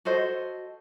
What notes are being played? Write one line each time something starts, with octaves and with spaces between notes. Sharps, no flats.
F#4 A4 C5 D#5